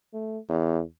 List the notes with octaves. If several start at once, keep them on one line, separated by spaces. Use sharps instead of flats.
A3
E2